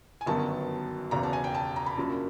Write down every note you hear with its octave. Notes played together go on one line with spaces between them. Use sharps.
G#5
G1 F#2 D#3 F#3 B3 A5
F#1 E2 B2 A#5
A5
G#5
G5
A5
A#5
B5
F#2 C#3 F3 A#3 D4